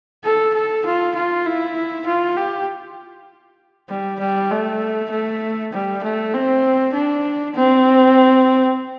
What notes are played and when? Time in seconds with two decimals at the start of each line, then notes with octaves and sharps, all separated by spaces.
0.25 A4
0.54 A4
0.85 F4
1.16 F4
1.46 E4
2.06 F4
2.37 G4
3.89 G3
4.20 G3
4.51 A3
5.11 A3
5.73 G3
6.03 A3
6.34 C4
6.94 D4
7.55 C4